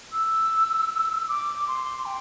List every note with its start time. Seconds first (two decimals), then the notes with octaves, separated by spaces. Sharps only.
0.12 E6
1.28 D6
1.68 C6
2.06 G5